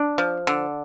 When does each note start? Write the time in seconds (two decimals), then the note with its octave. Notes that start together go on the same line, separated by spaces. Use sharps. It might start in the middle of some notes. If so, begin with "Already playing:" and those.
Already playing: D4
0.18 F3
0.47 D3